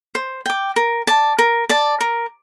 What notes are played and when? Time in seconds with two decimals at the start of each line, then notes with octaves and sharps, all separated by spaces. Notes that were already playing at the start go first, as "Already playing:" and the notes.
0.15 C5
0.46 G5 D6
0.76 A#4
1.07 D5 A5
1.39 A#4
1.69 D5 A5
2.01 A#4